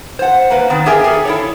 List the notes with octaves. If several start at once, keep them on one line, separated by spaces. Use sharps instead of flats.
C5 F#5
A#3 B4
D#3 B3 C4
G4 G#4 A#4 E5 G5 G#5
G#4 A4
E4 A4 C#5